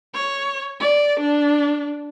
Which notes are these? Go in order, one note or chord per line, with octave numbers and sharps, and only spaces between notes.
C#5
D5
D4